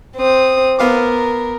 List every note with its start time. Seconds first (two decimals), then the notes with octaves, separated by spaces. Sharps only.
0.16 C4 D#6
0.79 B3 A#4 F5 D6